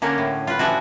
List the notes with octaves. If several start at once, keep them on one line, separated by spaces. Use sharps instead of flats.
D3 A#3 C#4
A2
F4 B4
E3 F3 D4 E4 F#4